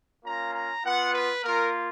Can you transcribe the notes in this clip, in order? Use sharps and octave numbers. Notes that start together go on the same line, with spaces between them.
A#3 C#4 F4 A#5
A#5
B3 F4 F#5
B4
A#3 F4 A#4